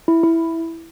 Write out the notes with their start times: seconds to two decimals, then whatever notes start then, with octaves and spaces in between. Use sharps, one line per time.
0.08 E4
0.23 E4